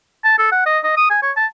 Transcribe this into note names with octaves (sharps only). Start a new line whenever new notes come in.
A5
A4
F#5
D#5
D#5
D#6
G#5
C#5
A5